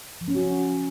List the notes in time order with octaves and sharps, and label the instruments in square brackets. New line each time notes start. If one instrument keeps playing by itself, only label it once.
[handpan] F3
C#4
F#4